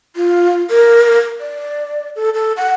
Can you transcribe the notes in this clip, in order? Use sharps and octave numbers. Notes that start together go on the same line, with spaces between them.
F4
A#4
D5
A4
A4
F#5